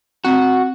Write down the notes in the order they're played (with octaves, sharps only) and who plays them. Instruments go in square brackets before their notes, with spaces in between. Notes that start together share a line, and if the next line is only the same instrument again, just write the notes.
[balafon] C4 [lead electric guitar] F#4